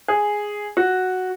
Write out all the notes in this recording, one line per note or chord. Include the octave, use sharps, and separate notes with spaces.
G#4
F#4